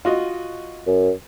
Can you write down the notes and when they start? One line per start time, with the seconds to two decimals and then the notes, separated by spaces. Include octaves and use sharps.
0.05 F4 F#4 D#5
0.87 F#2